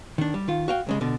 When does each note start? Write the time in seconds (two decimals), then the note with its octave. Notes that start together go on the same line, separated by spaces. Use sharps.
0.18 D#3 D4
0.34 G3
0.48 D#3 F4
0.68 F#4 F5 G5
0.87 C2 C#3 G#3
1.01 B2 D3